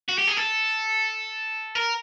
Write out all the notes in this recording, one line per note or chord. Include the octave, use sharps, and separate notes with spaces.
F#4
G4
G#4
A4
A#4